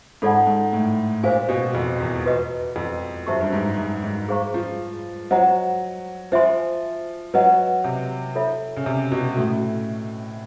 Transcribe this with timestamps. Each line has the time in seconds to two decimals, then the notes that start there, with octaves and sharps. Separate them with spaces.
0.22 G#2 F4 A4 D5 F#5 A5
0.47 G#2
0.73 A2
1.23 A#2 C5 F5 G#5
1.49 B2
1.75 F2
2.00 E2
2.26 F#4 B4 D#5
2.76 F2
3.27 F#2 G4 C5 E5 A5 C#6
3.41 G2
3.53 G#2
3.77 G#2
4.03 G#2
4.29 G#4 C5 F5 A#5 C#6
4.54 F3
5.31 F#3 C5 D#5 F#5 A#5
6.32 F3 C5 E5 G#5 C6
7.34 F#3 B4 D#5 F#5
7.84 C3
8.35 F4 A4 C#5 E5
8.76 C#3
8.86 C3
9.12 B2
9.37 A2 C#4 F#4 A4